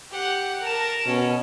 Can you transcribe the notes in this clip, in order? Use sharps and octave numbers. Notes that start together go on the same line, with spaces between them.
G4 F#5
A#4 A5
B2 C#4